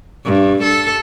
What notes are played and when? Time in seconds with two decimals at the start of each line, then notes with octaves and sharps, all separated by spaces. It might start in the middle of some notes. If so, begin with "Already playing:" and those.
0.25 G2
0.62 A4